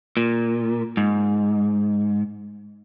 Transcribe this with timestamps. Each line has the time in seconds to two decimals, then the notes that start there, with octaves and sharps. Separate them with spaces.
0.17 A#2
0.97 G#2